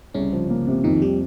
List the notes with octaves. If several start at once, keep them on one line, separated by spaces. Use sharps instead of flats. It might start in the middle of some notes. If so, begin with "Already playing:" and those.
C2 C#3 C#4
F3
A#3
C3
F2 D#3 D#4
G3 G4